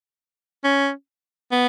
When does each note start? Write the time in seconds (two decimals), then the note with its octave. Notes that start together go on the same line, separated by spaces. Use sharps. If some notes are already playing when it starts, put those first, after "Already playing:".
0.64 C#4
1.52 B3